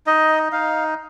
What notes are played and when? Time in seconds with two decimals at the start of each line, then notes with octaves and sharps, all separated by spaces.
0.07 D#4 D#5
0.52 D#4 F5